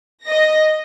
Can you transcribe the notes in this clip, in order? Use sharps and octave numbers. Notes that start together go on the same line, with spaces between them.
D#5 A#6